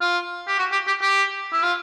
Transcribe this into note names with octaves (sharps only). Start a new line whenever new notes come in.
F4
G4
F#4
G4
G4
G4
E4
F4